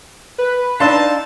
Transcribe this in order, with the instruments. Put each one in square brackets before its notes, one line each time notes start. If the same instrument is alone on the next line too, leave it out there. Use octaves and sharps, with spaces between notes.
[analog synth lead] B4
[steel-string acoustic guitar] D4 D#4 [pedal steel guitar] F5 C6 E6 [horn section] A5